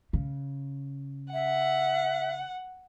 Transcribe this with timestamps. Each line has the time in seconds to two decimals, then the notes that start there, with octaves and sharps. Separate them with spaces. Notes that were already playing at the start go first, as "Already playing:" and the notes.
0.13 C#3
1.33 E5 F#5